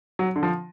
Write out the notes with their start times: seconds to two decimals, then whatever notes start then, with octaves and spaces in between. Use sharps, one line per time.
0.19 F#3
0.36 D3
0.43 F3